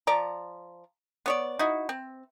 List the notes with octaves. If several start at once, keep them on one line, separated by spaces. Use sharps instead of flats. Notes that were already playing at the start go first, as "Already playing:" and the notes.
F3 D5 A#5
B3 C#5 D5
D#4 E4 F#4
C4